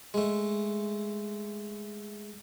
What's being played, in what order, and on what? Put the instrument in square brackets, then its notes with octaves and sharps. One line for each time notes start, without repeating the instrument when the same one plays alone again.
[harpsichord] G#3 A3